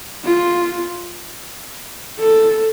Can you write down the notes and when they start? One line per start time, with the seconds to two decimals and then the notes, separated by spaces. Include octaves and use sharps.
0.25 F4
2.19 A4